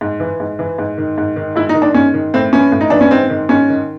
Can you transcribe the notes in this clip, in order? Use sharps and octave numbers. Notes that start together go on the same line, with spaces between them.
G#2
E3
G#2
E3
G#2
D#3
G#2
D#3
G#2 E4
D#4
D#3
D4
G#2 C#4
D#3
A2 C4
E3 C#4
A2
D#4
E3 D4
C#4
G#2 C4
D#3
G#2 C#4
D#3